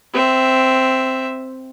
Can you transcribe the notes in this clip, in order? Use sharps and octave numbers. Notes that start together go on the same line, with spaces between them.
C4 E5